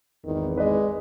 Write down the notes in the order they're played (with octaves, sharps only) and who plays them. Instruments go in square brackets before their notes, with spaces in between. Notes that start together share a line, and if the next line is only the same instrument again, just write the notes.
[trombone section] G#1 E2 [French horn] D#3
[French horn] G#3 [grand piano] B4 D5 D#5